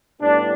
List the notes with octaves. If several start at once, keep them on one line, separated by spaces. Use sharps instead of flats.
A2 G3 B3 D4